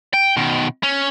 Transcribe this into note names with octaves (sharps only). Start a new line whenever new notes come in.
G5
B2 D#3
C#4